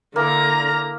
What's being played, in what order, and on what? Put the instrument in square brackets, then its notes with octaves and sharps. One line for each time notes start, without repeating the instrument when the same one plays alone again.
[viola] D3 A#5 [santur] A#3 E4 A#4